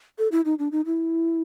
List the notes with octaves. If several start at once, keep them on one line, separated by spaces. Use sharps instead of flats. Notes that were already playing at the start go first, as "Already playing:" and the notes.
A4
E4
D#4
D4
D#4
E4